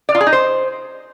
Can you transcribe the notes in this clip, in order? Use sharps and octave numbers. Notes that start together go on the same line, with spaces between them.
D5
F4
G#4
D#4
C5